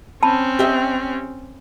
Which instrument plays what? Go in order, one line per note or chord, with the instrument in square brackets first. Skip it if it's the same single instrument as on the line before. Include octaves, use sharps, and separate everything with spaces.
[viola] C4 C#4 [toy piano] A5 B5
[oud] G4 D#5 E5